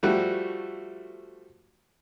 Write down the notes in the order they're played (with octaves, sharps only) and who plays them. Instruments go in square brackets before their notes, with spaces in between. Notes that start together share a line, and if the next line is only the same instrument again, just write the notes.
[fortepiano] F3 G3 A3 F#4